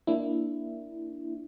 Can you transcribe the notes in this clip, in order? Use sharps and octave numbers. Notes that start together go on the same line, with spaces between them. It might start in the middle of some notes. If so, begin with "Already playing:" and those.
A#3 D4 E4